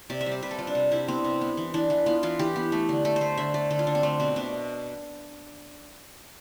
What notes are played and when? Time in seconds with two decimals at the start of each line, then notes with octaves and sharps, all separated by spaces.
0.10 C3 D5
0.21 E5
0.26 G3
0.32 D5
0.42 C3 B4
0.51 A4
0.58 G3 F4
0.67 D4
0.75 C3
0.91 G3 E4
1.08 B3 C4
1.24 C3
1.41 B3
1.57 E3
1.74 E3 D4
1.90 E3
2.06 B3 F4
2.23 E3 F4
2.39 E3 G4
2.56 B3
2.72 A3
2.89 D3
3.05 A3 A4
3.16 C5
3.21 A3
3.37 D3 E5
3.54 A3 D5
3.70 D3 A4
3.79 F4
3.87 D3 D4
3.95 C4
4.03 A3 D4
4.20 B2 C4
4.36 B2 D4